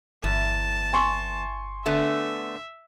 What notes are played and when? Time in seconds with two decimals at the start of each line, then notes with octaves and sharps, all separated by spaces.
0.24 G1 E2 A5
0.93 G#5 C6 C#6
1.86 D3 A3 B3 E5